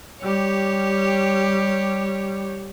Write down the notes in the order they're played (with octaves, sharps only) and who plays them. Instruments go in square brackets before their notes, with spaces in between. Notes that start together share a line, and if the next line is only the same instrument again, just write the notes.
[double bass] G3 [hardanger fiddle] G4 C#5